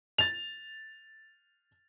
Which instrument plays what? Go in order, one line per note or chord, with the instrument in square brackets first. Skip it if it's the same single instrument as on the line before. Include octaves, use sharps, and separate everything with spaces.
[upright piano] A6 F7